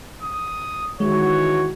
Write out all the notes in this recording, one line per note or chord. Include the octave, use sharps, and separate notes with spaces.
D#6
D#3 E3 G#3 F#4 C#5